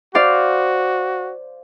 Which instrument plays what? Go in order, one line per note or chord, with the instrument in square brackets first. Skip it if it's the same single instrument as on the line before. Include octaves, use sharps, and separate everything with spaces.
[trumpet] F#4 [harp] C5 D5 F5